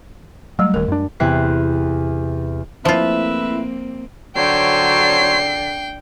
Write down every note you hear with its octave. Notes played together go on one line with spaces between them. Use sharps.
F#3 G3 A3
D#1 D#2 A#4
F#2 D4
E2 C3 C4 E4 F#6 C7
F3 A3 A#3 C4 E4 F4 B4 E5
D3 F#3 C5 C#5 G5 C7